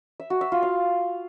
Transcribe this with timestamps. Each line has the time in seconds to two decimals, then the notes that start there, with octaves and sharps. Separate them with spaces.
0.20 E5
0.30 F#4
0.41 E5
0.52 F4
0.63 F5